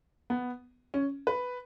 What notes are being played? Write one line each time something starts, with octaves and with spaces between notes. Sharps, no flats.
B3
C#4
B4